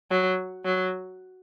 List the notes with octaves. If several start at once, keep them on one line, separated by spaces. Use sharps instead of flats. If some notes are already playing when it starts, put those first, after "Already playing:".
F#3
F#3